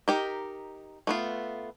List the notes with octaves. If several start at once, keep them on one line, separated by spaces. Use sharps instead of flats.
D#4 G4 A#4
A3 B3 F4